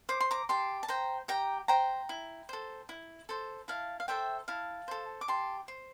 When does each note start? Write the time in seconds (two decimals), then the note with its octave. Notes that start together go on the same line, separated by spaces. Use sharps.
0.09 C5 D6
0.21 C6
0.31 A#5 D6
0.49 G4 A5 C6
0.83 A5
0.88 C5 G5 A#5
1.28 G4 G5 A#5
1.68 C5 G5 A#5
2.09 E4
2.49 A4 C5
2.89 E4
3.29 A4 C5
3.68 E4 F5 A5
4.00 F5
4.08 A4 C5 E5 G5
4.48 E4 F5 A5
4.88 A4 C5
5.21 D6
5.28 G4 A5 C6
5.68 C5